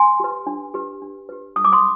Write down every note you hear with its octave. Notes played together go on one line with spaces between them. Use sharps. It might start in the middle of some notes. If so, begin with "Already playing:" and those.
Already playing: G#5 C6
G4 B4
D4
G4 B4
D4
G4 B4
D4 D#6
D6
C6 D#6